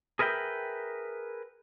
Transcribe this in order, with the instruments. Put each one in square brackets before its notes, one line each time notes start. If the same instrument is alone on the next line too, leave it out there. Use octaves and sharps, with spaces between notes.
[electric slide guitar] G#4 A#4 B4 E5 G5